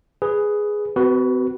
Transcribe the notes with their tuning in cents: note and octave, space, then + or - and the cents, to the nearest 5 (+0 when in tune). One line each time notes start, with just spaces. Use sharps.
G#4 +0 B4 +5
C4 -40 F#4 +25 B4 -10